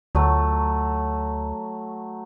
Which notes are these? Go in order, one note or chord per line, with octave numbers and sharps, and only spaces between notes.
D2 F#3 A3